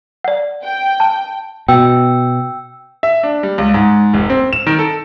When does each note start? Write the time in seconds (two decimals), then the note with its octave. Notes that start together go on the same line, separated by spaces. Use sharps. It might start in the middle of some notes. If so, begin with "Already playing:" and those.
0.24 D5 F#5
0.63 G5
1.00 A5
1.68 B2 G5 E6
3.03 E5
3.23 D4
3.43 G3
3.58 C#2
3.74 G#2
4.14 F1
4.30 C4
4.53 E7
4.67 D#3
4.79 A4